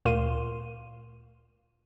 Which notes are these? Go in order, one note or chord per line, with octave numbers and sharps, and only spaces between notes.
D2 A#2 A#4 F5 C6 D#7